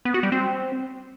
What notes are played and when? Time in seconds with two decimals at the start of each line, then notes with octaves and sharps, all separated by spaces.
0.05 B3
0.14 F#4
0.23 G3
0.32 C4